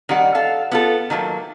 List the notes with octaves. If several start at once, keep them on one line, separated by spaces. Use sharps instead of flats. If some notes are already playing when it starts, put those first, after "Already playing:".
D#3 G3 F#5
A4 F5
B3 F4 A4
D#3 F#3 A3 A#3